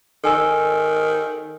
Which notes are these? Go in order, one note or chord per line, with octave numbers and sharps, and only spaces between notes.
D#3 A4 G#5 E6